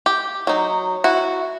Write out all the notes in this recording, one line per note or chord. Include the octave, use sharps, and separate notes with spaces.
G4
F#3 D#4
E4 F#4